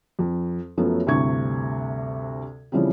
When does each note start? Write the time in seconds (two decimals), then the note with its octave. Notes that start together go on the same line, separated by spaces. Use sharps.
0.19 F2
0.77 F#2 F3 F#3 A3 B3 C#4
1.07 D2 G2 C3 E4 C#6 G#6
2.72 C#3 E3 F3 G3 C4